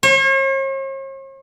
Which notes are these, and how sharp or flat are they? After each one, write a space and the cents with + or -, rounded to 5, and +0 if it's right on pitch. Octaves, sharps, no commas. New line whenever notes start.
C#5 -45